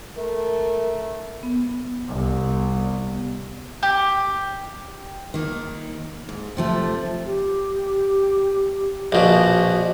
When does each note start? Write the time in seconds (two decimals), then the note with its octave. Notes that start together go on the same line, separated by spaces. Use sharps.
0.17 A3 A#4
1.43 B3
2.08 C2
3.83 G4
5.34 D#3 A#3
6.29 G#2
6.57 C3 F3 A3
7.25 G4
9.12 A#1 B2 F#4